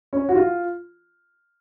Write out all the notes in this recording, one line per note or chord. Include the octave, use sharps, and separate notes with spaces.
C#4
F#4
F4